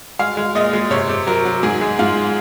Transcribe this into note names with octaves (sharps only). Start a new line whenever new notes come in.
G#3 F5
G#3
A#2 D#5
G#3
C3 C#5
C3
F#3 A#4
F#3
G#2 G#4
G#3
G#2 F4